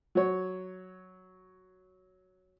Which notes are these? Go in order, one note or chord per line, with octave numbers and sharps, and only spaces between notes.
F#3 C#5